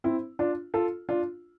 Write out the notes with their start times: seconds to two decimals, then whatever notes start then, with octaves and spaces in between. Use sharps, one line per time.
0.04 C4 E4
0.39 D4 F4
0.74 F4 A4
1.09 D4 F4